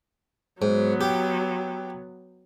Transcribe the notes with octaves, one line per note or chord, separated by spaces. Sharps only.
G#2 F#3 B3
G4